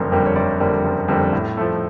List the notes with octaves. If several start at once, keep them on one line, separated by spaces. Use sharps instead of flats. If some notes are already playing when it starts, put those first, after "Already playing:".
Already playing: F#1 F2 D3 G3 A#3
F2 D3 G3 A#3
C#5
F#1 D5
F2 D3 G3 A#3
F#1
F2 D3 G3 A#3
A2
F3 A3